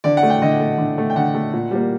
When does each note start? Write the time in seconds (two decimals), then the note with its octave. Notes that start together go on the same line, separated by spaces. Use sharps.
0.04 D3 D5
0.17 F#5
0.23 A3
0.30 G5
0.42 D3 D#5
0.60 A3
0.78 D3
0.98 A3
1.10 G5
1.16 D3 F#5
1.35 A3
1.53 A#2
1.71 G3 A#3